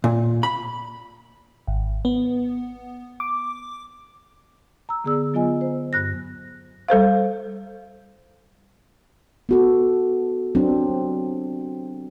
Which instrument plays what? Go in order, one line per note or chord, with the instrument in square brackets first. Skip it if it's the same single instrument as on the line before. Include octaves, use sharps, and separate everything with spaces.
[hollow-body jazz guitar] A#2
B5
[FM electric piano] G#1
B3
D6
[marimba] A#5 E6
D3 B3 G#4 D5 E6
F#3 B3 F4 D#5 G#5
C5
G2 F#6 A#6
[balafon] G3 A4 C5 F5
[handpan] B3 F#4 A4
F#3 C4 D4